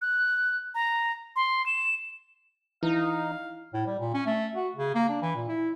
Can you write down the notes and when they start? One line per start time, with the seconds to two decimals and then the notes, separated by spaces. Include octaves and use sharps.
0.02 F#6
0.75 A#5
1.36 C6
1.66 E7
2.83 E3 D#4 E4 F5
3.74 A2
3.86 G3
4.00 A#2
4.14 C#4
4.26 A3
4.56 F#4
4.76 C#3
4.95 A#3
5.09 D4
5.22 E3
5.35 A#2
5.48 E4